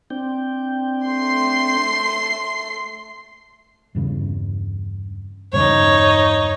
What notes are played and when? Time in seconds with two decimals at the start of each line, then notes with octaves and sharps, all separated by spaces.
0.10 C4 D4 G5
1.06 A3 C6 C7
3.95 E2 G2 C#3
5.53 E2 G2 C#3 D#4 C#5